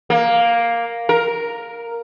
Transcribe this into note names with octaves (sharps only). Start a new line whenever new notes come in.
A#3
A#4